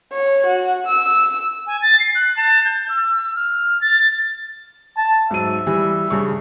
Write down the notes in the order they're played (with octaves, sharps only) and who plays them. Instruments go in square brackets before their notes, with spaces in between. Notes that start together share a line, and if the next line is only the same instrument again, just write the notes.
[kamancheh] C#5
F#4
E6
[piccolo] G#5
A6
C7
F#6
A5
G6
E6
F6
A6
[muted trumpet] A5
[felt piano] G#2 F#3 D#7 [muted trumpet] E5
[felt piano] E3 G3
G2 C#3 C#6